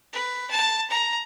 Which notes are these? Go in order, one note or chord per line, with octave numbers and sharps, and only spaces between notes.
B4
A5
A#5